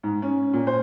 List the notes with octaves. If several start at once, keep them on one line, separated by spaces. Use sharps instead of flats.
G#2
C#4
A#2
C5